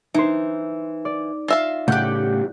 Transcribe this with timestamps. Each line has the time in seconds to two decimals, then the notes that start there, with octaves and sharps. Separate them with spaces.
0.14 E3 D#4 C5
1.05 D5
1.48 F4 E5 F5 A#6
1.88 A2 C#3 A3 G4 F#5 F#6 G6